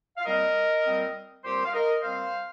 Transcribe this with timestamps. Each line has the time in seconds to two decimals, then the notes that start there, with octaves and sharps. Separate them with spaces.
0.18 F5
0.25 A#2 G3 C4 A#4 D#5
0.85 A#2 G3 C4
1.43 A#2 G3 C4 G4 C5
1.65 F5
1.73 A#4 D#5
2.03 A#2 G3 C4 C5 F5